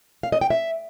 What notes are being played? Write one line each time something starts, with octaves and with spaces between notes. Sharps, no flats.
F5
D#5
G5
E5